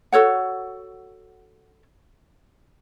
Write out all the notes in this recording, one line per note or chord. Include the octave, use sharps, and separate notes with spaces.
F#4 A4 C#5 F#5